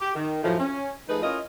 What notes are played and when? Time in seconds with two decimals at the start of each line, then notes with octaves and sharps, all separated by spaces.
0.01 G4
0.15 D#3
0.43 F#2 A2 F3
0.58 C#4
1.08 F3 A3 D#4 G#4 B4 D#5
1.23 C#4 E4 F4 A#4 D#5